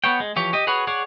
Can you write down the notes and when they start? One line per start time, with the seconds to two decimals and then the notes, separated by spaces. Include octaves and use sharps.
0.04 B3 F#4 C#5 G5
0.20 G#3
0.36 E3 F3 G4 C#5
0.53 G4 D#5
0.67 F#4 G#4 B4 C#5
0.87 G#4 C#5 D5 F#5